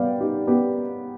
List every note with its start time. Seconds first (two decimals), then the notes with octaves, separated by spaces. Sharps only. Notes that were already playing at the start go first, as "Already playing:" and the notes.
Already playing: G3 B3 D5 F5 G5
0.20 D#4 G4
0.47 B3 G4